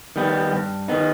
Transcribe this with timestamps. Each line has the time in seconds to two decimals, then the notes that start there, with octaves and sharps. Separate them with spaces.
0.16 D#3 G3 B3
0.52 G2
0.88 D#3 B3 D#4